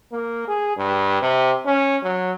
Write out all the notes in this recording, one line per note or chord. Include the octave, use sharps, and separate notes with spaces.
A#3
G#4
G2
C3
C#4
F#3